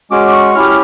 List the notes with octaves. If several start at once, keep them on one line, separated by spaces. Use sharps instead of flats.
G#3 C#4 F#4 D6
D6
C#6
C#4 E4 G4 F6